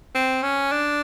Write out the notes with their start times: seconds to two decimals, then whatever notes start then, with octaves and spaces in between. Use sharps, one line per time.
0.15 C4
0.43 C#4
0.72 D4